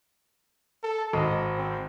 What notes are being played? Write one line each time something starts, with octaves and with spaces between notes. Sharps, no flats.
A4
G#1 D#5
C4